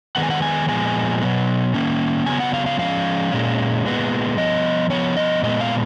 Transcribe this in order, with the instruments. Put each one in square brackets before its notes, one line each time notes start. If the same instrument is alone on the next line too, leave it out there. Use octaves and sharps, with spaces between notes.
[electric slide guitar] D#3 G#3 B3 F#5
G#5
F#5
G#5
A#2 F3 G#3 B3 G#5
B2 F#3 B3
D#3 A#3 C#4
C#3 F#3 B3 G#5
F#5
F5
F5
F3 G#3 C#4 F5
A#2 G#3 C#4
A#2 G#3 B3
F3 B3 D#5
F3 B3 C#5
D#5
A#2 G#3 B3 D#5
F5